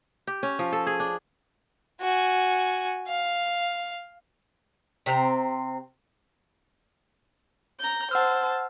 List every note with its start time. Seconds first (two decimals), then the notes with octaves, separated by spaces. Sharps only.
0.27 G4
0.43 C#4
0.59 F3
0.72 A4
0.87 G#4
1.00 D4
2.01 F#4 G#5
3.08 F5
5.06 C3 C4 A4 A#5
7.80 A#5 G6
8.11 C5 F#5 A5 E6 F6